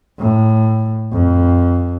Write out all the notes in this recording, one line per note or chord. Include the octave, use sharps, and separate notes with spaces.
A2
F2